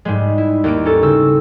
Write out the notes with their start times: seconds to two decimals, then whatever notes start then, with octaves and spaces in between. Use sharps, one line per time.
0.05 G#2 G3 G#3
0.38 E4
0.64 D#2 A#3 D7
0.85 C#4 D#4 A4
1.03 C#3 C4 E6